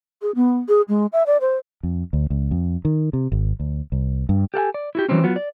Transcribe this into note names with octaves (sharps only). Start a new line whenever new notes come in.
G#4
B3
G#4
G#3
E5
D5
C5
F2
D2
C#2
F2
D#3
C3
G#1
D2
C2
G2
G4 A4 F#5 G#5
D5
E4 F#4 G4
E3 F#3 G3 C4 C#4
F#3 B3 F4 F#4
D5